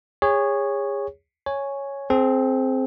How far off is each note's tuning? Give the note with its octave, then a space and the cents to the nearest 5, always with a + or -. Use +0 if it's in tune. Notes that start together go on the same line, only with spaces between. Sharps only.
G#4 -30 C#5 +0
C#5 +0 G#5 +0
C4 +0 G#4 +40